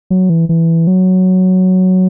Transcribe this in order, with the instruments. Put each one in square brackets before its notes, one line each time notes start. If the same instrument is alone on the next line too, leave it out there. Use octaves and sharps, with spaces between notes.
[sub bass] F#3
E3
E3
F#3